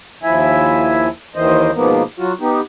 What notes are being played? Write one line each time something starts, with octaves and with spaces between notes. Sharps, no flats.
D#2 F3 E4 E5 G#5
D#2 D#3 E3 C5 D#5
G#2 B2 F3 A#3 B3
F#3 F4 F#4
B3 D#4 G4